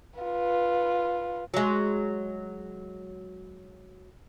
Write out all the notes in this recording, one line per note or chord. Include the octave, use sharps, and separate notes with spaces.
F4 B4
F#3 G#3